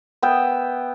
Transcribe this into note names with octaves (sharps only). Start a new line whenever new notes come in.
B3 E5 G5